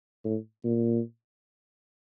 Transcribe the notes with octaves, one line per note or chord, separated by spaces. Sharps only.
A2
A#2